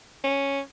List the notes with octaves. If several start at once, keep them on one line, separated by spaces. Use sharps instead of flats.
C#4